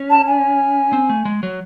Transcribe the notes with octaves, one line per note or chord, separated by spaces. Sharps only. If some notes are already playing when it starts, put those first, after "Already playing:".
Already playing: C#4
A5
G#5
C4
A3
G#3
F#3